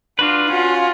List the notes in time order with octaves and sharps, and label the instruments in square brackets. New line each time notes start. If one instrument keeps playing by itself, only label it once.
[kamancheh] D4 [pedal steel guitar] F4 F#4 B4
[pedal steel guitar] C#4 [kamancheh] F4 F#4